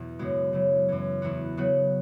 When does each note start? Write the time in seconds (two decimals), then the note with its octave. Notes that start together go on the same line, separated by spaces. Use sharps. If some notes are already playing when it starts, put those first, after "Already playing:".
Already playing: E2 B2
0.19 F#2 C#3 G#3 B3 F#4
0.53 C#3 F#3 E4
0.88 F#2 E3 C#4
1.22 E2 E3 B3 F#4
1.57 C#3 F#3 B3 F#4